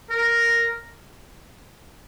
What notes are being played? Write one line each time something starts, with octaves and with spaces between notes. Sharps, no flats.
A#4